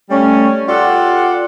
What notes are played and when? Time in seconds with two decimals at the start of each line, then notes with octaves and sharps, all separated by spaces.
0.10 G3 A3 C#4
0.68 F4 G4 A4 D5 F#5